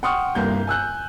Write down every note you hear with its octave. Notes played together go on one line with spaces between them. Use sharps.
F#5 G5 C6 C#6 D#6 F6
G1 C2 A#3 G6
G#5 E6 F#6 G6